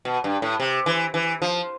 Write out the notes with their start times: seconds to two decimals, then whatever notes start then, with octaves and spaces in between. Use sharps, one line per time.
0.05 B2
0.24 G2
0.42 A2
0.60 C3
0.86 E3
1.14 E3
1.42 F3